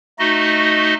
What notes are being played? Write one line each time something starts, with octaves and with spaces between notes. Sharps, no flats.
A3 D#4 F#4 D#5